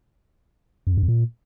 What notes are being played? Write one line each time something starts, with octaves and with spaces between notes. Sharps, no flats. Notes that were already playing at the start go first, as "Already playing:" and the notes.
F#2
F2
G2
F2
A#2